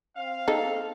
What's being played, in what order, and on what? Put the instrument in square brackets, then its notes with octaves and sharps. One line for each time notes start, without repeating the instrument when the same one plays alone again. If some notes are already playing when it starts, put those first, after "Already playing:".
[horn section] C4 F5
[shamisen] D#4 A4